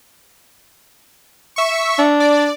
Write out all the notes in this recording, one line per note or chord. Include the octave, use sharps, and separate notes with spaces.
E5 C#6
D4
D5